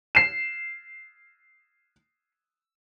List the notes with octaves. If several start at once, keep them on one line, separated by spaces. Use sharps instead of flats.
C7 E7